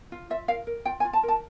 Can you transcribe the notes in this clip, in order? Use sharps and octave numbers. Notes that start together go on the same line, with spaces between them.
F4
F4 E5
A#4 F5
A#4
F4 G5
G#5
F4
A5
A#4
A5